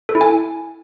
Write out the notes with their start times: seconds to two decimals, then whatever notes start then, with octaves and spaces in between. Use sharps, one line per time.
0.09 A4
0.15 E4
0.21 G#5